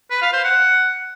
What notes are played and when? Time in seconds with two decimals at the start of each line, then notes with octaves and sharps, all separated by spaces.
0.11 B4
0.22 F5
0.33 C5
0.44 F#5